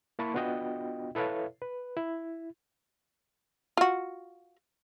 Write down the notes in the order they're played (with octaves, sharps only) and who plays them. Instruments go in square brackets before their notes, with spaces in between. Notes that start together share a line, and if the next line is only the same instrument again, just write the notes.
[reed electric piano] A#3 E4 A5 B5 C#6
B3 D4 F4 F#4 D#5 G5
E4 A4 B4 C#5 E5 F5
B4
E4
[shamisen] F4 F#4